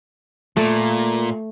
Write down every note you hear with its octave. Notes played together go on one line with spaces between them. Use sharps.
A#2 A3